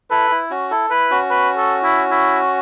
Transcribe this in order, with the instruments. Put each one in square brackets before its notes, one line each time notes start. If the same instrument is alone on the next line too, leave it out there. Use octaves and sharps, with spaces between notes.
[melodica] E4 A4 [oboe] B4
[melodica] E4
C#4 F#4
E4 A4
[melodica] E4 [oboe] B4
[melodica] C#4 F#4
[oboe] B4
A4
E4
E4